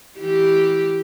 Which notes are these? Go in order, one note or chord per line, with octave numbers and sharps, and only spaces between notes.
E3 G4